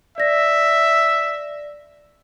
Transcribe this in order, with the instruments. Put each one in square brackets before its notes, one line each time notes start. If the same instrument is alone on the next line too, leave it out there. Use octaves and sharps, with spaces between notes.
[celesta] D5 A#6 [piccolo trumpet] E5